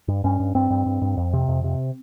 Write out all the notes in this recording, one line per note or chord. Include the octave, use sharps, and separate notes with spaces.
G2
G2 C#4
G2
G2 C4
G2
G2
G2
F2
C3
F2
C3